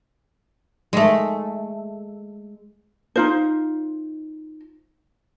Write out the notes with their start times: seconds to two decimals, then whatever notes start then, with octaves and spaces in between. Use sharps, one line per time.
0.93 G#3 A3
3.16 D#4 F4 C5